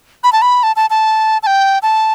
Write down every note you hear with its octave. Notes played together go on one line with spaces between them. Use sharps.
B5
A5
B5
A5
A5
A5
A5
G5
A5